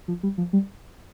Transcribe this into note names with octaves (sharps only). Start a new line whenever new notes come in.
F3
G3
F3
G3